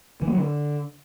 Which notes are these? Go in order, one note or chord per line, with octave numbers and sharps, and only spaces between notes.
E3
A#3
F#3
D3